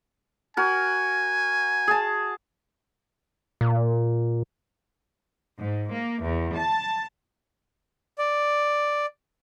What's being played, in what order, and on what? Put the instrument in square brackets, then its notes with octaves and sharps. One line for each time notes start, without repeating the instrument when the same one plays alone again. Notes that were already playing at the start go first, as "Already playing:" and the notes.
[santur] F#4 A#4 [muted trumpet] G#5
[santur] G#4 A5
[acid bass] A#2
[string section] G#2
A#3
E2
A5
[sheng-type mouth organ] D5